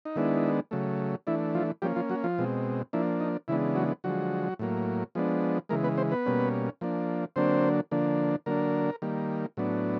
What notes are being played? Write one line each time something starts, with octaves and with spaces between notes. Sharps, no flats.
D#4
D#3 G#3 B3 D4 E4
C#3 F#3 A3
E3 A3 D4 E4
F3 F4
F3 G3 A#3 C#4 G4
F3 F4
F#3 F#4
F3 F4
B2 G#3 C4
F3 A#3 D4 E4
D#4
C#3 E3 G#3 B3 D4 E4
F#3 F#4
D3 F3 F#3 G#3 F#4
A2 F#3 A#3
F3 G#3 B3 D4
C#3 E3 G#3 A#3 A#4
B3 B4
C4 C5
B3 B4
B2 G3 A#3 C#4
F3 A#3 D4
D3 F#3 A#3 C4 D4 C5
D3 F3 A#3 D4
D3 F#3 A#3 D4 A#4
D#3 G3 A#3
A2 F#3 B3 D4